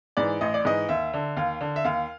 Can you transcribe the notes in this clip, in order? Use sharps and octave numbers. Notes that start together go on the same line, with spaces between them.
G#2 E3 D5
A1 D#5
D5
G#2 E3 D#5
D#2 E5
D3
D#2 F5
D3
E5
D#2 F5